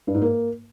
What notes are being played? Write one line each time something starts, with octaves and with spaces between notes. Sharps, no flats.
G2
G#2
A#3